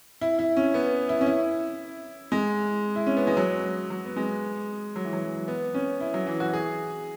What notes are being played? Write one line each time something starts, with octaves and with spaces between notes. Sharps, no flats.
E4
E4
C#4
B3
E4
C#4
E4
G#3
E4
C#4
B3
G#3
F#3
F#3
B3
G#3
F#3
E3
F#3
B3
C#4
E4
F#3
E3
F#4
G#4